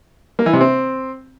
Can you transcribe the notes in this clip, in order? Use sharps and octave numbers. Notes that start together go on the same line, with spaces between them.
A#3
E3
C3
C4